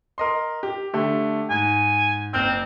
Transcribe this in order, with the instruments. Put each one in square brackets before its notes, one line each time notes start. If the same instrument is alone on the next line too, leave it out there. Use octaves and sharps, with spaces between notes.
[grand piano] A#4 D#5 C6
G4
D3 A3 G4
[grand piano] G#2 [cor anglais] G#5
[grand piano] F#1 F6 G6 [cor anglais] C4